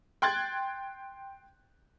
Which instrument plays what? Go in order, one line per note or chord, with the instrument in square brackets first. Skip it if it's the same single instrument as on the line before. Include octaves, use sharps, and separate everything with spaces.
[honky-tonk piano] G5 C6 F#6 G#6 A6